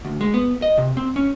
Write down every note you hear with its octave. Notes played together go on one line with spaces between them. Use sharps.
D2
G#3
B3
D#5
C3
C4
C#4